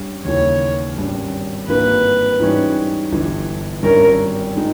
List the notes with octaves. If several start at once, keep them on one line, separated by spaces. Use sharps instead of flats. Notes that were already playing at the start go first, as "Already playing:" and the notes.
Already playing: G2 G3 C#4
D#2 C#3 E3 C#5
G#1 G2 G3 C#4
G#1 G2 E3 A#3 B4
G#2 E3 G3 C#4
G1 G2 E3
G#1 G2 G3 C#4 E4 A#4
D#3 G#3 D#4